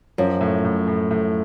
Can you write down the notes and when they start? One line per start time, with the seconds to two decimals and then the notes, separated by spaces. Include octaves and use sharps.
0.18 F#2 F3
0.41 A2
0.65 A2
0.88 A2
1.11 A2